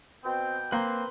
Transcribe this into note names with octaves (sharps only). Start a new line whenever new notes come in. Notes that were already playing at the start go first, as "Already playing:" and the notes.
B2 C4 G5
A#3 C4 B4 C6